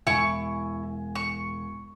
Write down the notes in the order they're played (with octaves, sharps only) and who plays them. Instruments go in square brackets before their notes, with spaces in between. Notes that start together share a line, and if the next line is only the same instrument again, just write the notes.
[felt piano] E1 G#5 [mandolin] E4 C#6
[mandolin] C#6